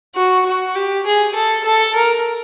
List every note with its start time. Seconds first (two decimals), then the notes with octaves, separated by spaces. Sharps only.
0.15 F#4
0.46 F#4
0.75 G4
1.06 G#4
1.35 A4
1.64 A4
1.95 A#4